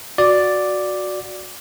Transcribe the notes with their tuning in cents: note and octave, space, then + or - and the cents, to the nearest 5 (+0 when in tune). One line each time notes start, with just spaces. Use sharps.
F#4 -10 D5 +0